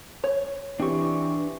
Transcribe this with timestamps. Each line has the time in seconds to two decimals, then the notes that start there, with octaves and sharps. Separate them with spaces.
0.24 C#5
0.80 E3 C4 D4 G4 C#6